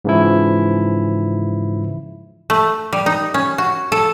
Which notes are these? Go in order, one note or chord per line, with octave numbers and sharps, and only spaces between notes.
G#2 C#3 E3 F3 E4
A3
G3
D#4
C#4
F#4
A4